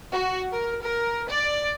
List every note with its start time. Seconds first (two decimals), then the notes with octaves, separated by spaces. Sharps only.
0.13 F#4
0.52 A#4
0.82 A#4
1.29 D5